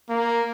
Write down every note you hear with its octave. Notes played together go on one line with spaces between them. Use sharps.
A#3